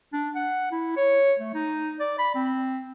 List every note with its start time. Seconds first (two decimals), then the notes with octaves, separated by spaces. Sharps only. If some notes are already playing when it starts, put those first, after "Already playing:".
0.13 D4
0.35 F#5
0.72 E4
0.97 C#5
1.39 A3
1.54 D#4
2.00 D5
2.19 B5
2.35 C4